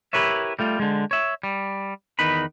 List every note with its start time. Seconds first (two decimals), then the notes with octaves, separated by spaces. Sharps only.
0.13 E4 G4 A#4 B4 C#5 E5
0.59 G3 A3 F4
0.80 D3 G#3
1.11 C#5 E5
1.43 G3
2.19 E2 D#3 D#4 B4 B5